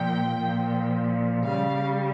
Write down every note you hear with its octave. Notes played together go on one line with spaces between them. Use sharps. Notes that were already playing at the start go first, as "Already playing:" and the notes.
Already playing: A#2 F3 G5
A#2 F3
C#3 G3 F5